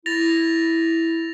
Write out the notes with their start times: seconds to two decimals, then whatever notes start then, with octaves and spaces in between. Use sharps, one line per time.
0.06 E4 A6 A#6 F7